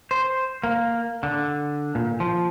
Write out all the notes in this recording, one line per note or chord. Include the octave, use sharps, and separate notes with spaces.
C5
A#3
D3
A#2
F3